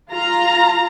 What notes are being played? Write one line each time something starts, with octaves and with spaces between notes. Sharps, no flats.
F4 A#5